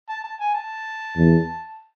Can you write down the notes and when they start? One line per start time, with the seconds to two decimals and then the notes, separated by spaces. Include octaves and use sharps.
0.09 A5
0.24 A5
0.40 G#5
0.55 A5
1.16 E2